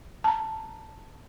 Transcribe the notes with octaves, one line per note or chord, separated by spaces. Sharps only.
A5 A#5